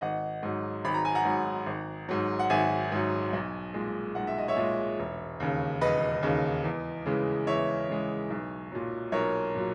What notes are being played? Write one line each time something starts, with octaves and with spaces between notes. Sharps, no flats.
G#1 D#5 F#5
G#2 F#3
G#1 B5
A#5
G#5
F#5 A#5
G#2 F#3
G#1
G#2 F#3
F#5
G#1 E5 G#5
G#2 F#3
B1
A#2 G#3
B1 F#5
E5
D#5
C#5 E5
A#2 G#3
E1
D#2 C#3
E1 B4 D#5
D#2 C#3
E2
C#3 E3 G#3
E2 C#5 E5
C#3 E3 G#3
B1
A#2 F#3
B1 A#4 C#5
A#2 F#3